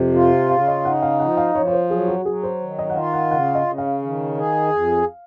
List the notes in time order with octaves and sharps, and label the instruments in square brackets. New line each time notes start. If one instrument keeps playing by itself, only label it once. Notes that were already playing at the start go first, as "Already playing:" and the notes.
Already playing: [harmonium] F2 C3
F4
[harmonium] C#3 [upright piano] F5
[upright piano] D#5
[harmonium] D#4 [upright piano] F#5
[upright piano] F5
[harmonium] F3 [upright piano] F#5
[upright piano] F5
[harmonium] F3 [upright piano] C#5
[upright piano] C#5
C5
[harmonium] F#3 [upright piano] G#4
[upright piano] F#4
[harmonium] F#3 [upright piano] G#4
[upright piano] C5
[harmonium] D#3
[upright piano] D#5
F#5
[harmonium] F4 [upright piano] F5
[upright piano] F#5
[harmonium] C#3 [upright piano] F#5
[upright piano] D#5
[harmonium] C#3
[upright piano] F5
[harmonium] D#3
G#4
F2